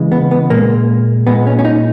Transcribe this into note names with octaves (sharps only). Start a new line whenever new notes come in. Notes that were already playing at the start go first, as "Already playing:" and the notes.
Already playing: C#3 E3 G#3
B3
B3
A#2 G#3 A#3
A#2 G#3 B3
C#4
C#4
D#4